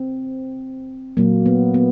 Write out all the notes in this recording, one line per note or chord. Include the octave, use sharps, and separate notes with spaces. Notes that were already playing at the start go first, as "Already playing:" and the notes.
Already playing: C4
A#2 F#3 A#3
B3
B3